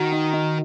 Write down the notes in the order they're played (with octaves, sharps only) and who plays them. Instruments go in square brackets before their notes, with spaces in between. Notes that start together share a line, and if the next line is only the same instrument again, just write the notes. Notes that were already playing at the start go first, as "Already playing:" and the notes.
Already playing: [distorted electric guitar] D#3 [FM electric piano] F#4
[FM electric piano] D#4
D#4